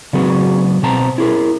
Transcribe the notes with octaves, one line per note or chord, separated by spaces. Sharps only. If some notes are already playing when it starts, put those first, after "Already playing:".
C#3 F#3 C4 F#4 G#4 B4
B2 C4 C5 G5 A5 A#5
E4 G#4 A#4